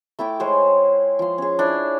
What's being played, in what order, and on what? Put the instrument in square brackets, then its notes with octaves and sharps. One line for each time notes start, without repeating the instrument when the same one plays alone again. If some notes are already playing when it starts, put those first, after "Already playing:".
[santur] A3 E4 G5 D6
G#3 C5 C#5 G5
F3 C6
C#4 G#4
D4 E4 C#5